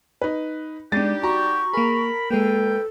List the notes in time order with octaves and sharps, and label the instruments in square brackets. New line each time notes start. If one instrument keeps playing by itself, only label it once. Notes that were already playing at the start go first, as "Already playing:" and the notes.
[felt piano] D#4 B4
[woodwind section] G3 D#4 G4 [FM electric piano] G#3 [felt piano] D4 A6
[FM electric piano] F#4 [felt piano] A#5 [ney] C#6
[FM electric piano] A#3 G#4 [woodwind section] A#4 B5
[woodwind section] D2 B4 G5 [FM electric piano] G#3 A#3 [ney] A4